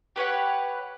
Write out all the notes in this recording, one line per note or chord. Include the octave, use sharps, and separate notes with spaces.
G4 B4 C#5 F#5